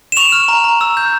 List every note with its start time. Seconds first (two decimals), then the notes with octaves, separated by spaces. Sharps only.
0.12 E7
0.17 C#6 F7
0.32 F6
0.48 A#5
0.64 A#5
0.81 E6
0.97 G6